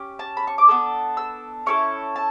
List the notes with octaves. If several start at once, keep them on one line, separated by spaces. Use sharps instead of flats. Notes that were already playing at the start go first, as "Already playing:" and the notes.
Already playing: C#4 G4
A5
B5
C#6
D6
B3 D4 A4 E6
E6
C#4 E4 A4 C#6
A5